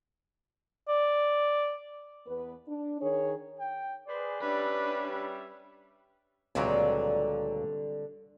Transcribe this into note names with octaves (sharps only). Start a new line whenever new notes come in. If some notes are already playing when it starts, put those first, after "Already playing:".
D5
E2 B3 B4
D4
D#3 G#4 C#5
G5
G#4 B4 C5 D5
G3 C#4 D4 B4 E5
C#2 A#2 D3 F#3 G3 C4